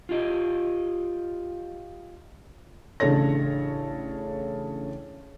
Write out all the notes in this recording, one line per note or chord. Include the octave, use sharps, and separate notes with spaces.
F4 G4 D#5
A1 C#3 D4 A4 C#5 A#6